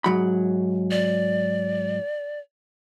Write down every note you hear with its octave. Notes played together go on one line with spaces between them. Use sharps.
G#2 F#3 B5
D5